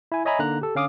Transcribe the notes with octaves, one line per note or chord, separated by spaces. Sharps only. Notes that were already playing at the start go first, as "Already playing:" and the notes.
E4 G#5
C#5 D#5 E5 G#5 A#5 B5
D3 A#3 D#4 A#5 F#6
G4 A4
D3 C#4 F5 D6 D#6